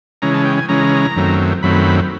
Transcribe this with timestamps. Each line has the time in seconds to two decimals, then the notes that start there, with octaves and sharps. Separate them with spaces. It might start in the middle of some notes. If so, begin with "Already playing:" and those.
0.22 C#3 E3 G#3 C#4 A#5
0.34 A5
0.45 G5
0.58 G#5
0.69 C#3 E3 G#3 C#4 A#5
1.16 F#2 D#3 F#3 A3 C4
1.63 F#2 D#3 F#3 A3 C4 B5